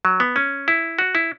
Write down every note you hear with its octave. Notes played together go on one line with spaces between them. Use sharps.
F#3
B3
C#4
E4
F#4
E4